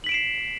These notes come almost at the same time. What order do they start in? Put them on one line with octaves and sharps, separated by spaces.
F#7 B6 D7 E7 C7